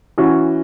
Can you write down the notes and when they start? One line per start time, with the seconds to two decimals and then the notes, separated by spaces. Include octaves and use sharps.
0.18 E3 C#4 F#4